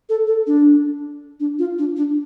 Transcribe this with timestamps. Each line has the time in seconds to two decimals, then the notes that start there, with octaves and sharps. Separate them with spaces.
0.09 A4
0.27 A4
0.47 D4
1.40 D4
1.59 F4
1.79 D4
1.97 D4